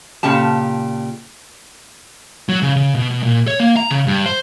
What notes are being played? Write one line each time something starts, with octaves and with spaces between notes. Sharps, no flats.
A#2 C#3 G4 A5
F#3
C#3
C#3
B2
B2
A#2
C#5
A#3
A#5
C#3
G2
C5